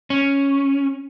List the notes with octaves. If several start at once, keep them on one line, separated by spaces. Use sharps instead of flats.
C#4